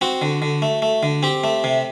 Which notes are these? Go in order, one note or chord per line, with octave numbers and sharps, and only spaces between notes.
C4 F#4
D3
D3
A3
A3
D3
C4 G4
A3
C3